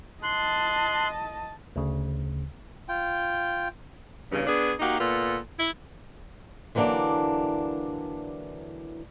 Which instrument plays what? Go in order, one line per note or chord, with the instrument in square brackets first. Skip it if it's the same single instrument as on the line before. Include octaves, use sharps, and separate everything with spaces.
[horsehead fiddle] D#5 A5 [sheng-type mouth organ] C6 F#6
[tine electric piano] D2 C#3
[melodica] F4 G5
[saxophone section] E2 G2 C#3
B3 D4 G#4
A#3 D#4 F#4 G4
A#2 B3 F4 A4
E4
[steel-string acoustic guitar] D3 E3 F#3 A#3 D4